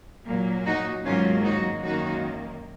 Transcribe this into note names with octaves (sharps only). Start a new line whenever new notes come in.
A#2 F#3 A#3
D#4 F#4
G#2 D#3 F#3 A#3 C#4 F4
D#4 F#4
F#2 D#3 A#3 D#4 F#4